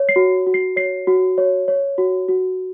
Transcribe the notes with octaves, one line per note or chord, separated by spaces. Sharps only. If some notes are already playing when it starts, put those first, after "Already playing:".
Already playing: C#5
C7
F#4
F#4
C7
C#5 C7
F#4
C#5
C#5
F#4
F#4